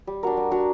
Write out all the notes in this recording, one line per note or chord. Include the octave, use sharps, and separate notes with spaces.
G3
D4 F#4 A#4
G3
D4 F#4 A#4